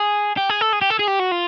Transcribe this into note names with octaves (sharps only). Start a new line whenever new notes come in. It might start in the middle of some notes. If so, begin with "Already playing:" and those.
Already playing: G#4
G4
G#4
A4
G#4
G4
A4
G#4
G4
F#4
F4